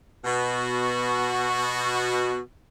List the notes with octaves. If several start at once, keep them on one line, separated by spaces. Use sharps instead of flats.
B2 F#4